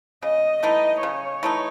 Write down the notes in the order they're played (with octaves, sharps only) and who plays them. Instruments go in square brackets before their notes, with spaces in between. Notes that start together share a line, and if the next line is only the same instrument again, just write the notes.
[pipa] C#3 [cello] D#5
[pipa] E3 A3 D#4 [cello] D#5
[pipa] C#3 [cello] C#5
[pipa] E3 A3 D#4